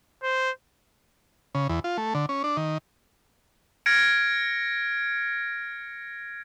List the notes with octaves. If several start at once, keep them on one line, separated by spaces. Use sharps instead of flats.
C5
C#3
E2
F4
A3
D3
C#4
D4
D#3
F6 G#6 A#6 C#7 D7